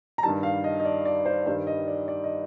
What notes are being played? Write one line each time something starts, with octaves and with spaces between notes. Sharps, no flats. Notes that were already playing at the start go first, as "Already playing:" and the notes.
A#5
G2 D#3 G3 A5
F5
D#5
D#5
D5
D5
C5
G2 D#3 G3 C5
D#5
D5
D5
D#5